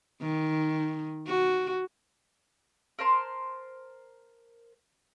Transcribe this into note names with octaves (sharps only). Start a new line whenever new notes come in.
D#3
F#4
A#4 C5 A5 C6